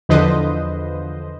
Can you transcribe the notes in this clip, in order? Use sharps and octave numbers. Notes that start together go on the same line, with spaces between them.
E2 D3 F3 B4 C5 D#5